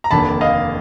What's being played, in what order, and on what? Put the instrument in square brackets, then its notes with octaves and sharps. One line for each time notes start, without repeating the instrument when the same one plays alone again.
[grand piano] A#5
F1 D#2 D3 A5 B5
D#5 F5